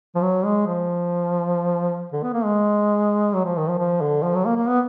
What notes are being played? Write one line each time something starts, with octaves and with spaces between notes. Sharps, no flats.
F3
F#3
G#3
F3
D3
B3
A#3
G#3
F#3
F3
D#3
F3
F3
D3
F3
F#3
A#3
A#3
B3